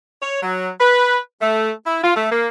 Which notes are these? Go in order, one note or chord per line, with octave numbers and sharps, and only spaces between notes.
C#5
F#3
B4
A3
E4
F4
A3
A#3